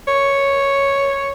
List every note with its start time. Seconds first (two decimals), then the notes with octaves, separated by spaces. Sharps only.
0.08 C#5